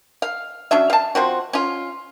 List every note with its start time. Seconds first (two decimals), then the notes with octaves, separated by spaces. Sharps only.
0.22 F5
0.71 F#3 C#4 D4 E5
0.90 F5 A5
1.15 F3 C4 F#4
1.53 C#4 F4